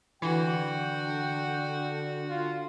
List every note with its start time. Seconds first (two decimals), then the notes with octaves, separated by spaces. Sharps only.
0.22 D3 E3 F#4 G5
2.30 F4